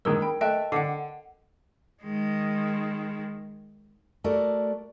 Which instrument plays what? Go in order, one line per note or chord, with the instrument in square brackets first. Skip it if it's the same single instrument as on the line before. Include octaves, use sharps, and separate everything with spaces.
[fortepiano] D#3 G#3 A#3 [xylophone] A#4 E6
[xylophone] G5 [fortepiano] B5
[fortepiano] A3 E5 [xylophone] D#5 G5 F#6
[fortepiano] D3 [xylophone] F#5 C7
[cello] D#3 G#3
[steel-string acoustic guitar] A3 F#4 A4 A#4 D5